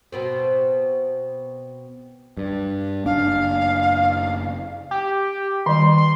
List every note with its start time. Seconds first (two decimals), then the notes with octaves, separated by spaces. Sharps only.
0.12 B2 B3 C4
2.37 G2
3.06 F#1 D4 F5
4.91 G4
5.66 D#3 G3 C6
5.98 C6